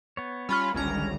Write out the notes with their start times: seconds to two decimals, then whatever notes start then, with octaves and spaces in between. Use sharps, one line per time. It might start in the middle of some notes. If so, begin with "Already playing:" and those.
0.17 B3 C#5
0.49 G3 C#4 F4 B5 F6
0.74 G#1 C#2 D3 G3 C#4 A#5